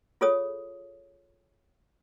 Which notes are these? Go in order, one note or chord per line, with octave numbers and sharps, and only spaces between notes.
F4 G#4 A4 C#5 D#6